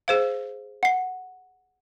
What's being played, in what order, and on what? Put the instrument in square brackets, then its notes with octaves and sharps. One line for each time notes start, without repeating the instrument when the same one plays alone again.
[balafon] G#4 C5 F5
[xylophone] F#5 C7